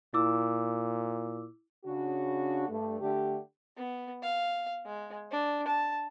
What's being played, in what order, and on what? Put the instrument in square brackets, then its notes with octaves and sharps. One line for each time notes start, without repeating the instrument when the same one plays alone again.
[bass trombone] A#2 [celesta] E4 D6 E6
[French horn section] C#3 D4 F#4
G2 A3
D3 A3 G4
[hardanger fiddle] B3
F5
G#3
D4
A5